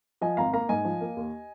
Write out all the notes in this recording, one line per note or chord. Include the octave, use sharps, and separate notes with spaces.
F3 D#5 G#5
G#1 F5 A#5
A#3 F5 A#5
G#2 D#5 G#5
F3
A#3
D#2